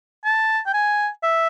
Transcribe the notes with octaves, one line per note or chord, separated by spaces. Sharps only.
A5
G5
G#5
E5